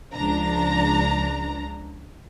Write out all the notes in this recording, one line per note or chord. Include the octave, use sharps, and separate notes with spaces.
C#2 F3 D4 A#5